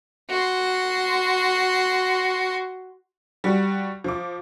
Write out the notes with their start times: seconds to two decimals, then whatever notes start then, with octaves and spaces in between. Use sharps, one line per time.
0.29 F#4 C6
3.44 G3 F#4
4.04 F3 D6